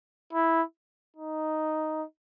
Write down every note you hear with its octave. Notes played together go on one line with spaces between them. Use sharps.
E4
D#4